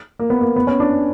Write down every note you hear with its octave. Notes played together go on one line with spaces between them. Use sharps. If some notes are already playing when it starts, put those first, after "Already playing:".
A#3
B3
A#3
B3
C#4
D4